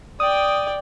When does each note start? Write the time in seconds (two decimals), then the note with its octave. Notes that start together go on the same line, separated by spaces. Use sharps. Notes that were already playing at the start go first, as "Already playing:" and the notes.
0.20 D5 G5 D#6